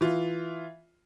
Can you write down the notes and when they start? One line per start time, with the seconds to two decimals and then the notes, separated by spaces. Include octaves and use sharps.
0.01 E3 F4